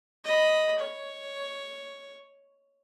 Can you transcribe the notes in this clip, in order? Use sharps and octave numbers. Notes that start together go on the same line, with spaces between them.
D#5 B5
C#5